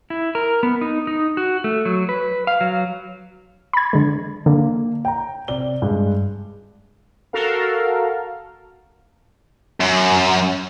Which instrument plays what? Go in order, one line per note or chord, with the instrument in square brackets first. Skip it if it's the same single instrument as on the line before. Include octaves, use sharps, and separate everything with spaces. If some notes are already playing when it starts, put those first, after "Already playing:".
[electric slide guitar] E4
A#4
B3
D#4
D#4
F#4
A3
F#3
B4
F5
F#3
[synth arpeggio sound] B5 G#6
D3 G#3
[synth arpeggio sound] D3 [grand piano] A#3
[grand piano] G5 A#5
C3 D5 G7
G2 G#3
[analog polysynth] F#4 A4 A#4 F5
[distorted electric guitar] F#2